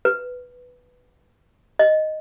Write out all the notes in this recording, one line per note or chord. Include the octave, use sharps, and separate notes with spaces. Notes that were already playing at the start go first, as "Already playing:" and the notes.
B4
D#5